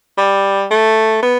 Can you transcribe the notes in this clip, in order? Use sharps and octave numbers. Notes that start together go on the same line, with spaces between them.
G3
A3
B3